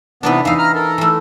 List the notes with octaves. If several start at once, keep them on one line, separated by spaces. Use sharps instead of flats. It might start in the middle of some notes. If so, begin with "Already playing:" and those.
C3 E3 B3 D4 D#4 B4
E2 E3 D#4 F5
A#5 F6
A4 A#4
E3 A3